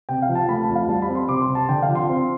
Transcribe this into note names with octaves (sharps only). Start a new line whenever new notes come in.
C3 G5
F5
F3
A5
A3 B5
A5
F2
F5
G3 A5
B5
C4
C6
C3 D6
C6
C3
A5
D3 G5
F5
F3
C6
C4